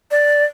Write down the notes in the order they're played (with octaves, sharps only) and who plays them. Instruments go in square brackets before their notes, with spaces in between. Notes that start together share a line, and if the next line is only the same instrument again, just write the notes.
[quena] D5